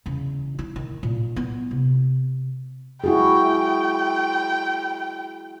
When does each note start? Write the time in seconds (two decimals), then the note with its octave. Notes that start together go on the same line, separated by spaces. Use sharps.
0.06 E2 C#3
0.59 E4
0.76 D#3
1.03 A#2
1.36 B3 E4
1.71 C3
3.04 E4 F#4 G#4 G5